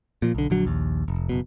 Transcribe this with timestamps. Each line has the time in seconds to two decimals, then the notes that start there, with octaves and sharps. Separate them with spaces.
0.22 A#2 F3
0.35 B1 D3
0.50 A#1 D3 F#3
0.65 A#1 D#2
1.08 F1
1.29 F#1 B2